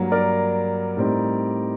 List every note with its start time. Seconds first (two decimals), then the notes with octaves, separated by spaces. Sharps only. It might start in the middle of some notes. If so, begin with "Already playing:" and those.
Already playing: G2 F#3 A#3
0.12 A#4 D5
0.97 A2 G3 C4 D#4